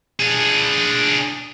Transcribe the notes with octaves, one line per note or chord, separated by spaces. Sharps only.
D4 G#4